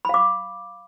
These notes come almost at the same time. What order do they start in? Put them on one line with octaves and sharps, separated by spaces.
B5 F5 D6